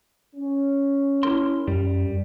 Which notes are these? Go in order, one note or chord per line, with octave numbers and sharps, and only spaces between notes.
C#4
E4 A#4 C6
F#2 G3